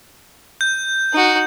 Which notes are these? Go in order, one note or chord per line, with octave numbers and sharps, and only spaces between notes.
G6
D#4 F#4